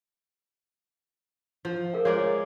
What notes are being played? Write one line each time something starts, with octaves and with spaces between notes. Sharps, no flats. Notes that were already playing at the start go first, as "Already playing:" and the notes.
F3
G#4 A#4 F5
G#3 A#4 C#5 D5 F5 D6